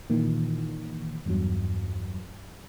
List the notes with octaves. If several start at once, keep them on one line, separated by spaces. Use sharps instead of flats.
A#2 D#3 E3
E2 G2 F#3